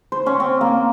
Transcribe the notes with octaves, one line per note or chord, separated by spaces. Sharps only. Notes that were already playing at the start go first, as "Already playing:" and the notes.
C5
C#4
C4
A#3